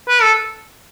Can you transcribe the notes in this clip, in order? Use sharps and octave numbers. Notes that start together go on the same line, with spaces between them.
B4
A4